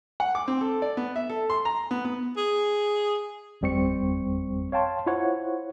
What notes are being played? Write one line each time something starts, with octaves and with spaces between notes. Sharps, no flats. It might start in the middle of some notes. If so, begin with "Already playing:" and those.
F#5
D6
C4
A4
D5
B3
E5
A4
C6
A#5
B3
B3
G#4
G1 F2 G3 C4 C#6 C#7
C#5 F5 G5 A5 C6
E4 F4 C5 C#5 F#5